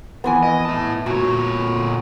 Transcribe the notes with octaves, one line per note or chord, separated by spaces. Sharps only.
F2 E3 B3 G#5
D#5
E4 A5
A#2 F#4 C#5